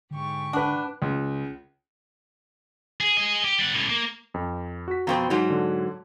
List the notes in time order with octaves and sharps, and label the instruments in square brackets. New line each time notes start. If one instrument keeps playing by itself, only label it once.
[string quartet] G#2 G4 C#6 [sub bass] D3
[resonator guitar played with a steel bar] D4 [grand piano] B4 F#5
[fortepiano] C#2
[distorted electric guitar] G#4
G#4 D#5
G4
G3 F#5
C#2 A2
A#3
[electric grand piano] F2
F#4 B6
[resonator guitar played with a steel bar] F2 B2 C4 [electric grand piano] A#5
[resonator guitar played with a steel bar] G#2 F#3
[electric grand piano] D3